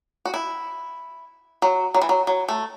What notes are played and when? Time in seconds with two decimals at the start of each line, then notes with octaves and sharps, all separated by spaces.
0.25 F#4
0.34 E4
1.62 F#3
1.94 F#3
2.02 E3
2.09 F#3
2.27 F#3
2.48 A3